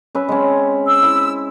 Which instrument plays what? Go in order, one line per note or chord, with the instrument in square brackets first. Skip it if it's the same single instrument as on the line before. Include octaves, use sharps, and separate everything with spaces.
[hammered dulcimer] C#4 B4 E5
G#3 C4 C#4
[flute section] E6
[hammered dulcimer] E4 E5 B5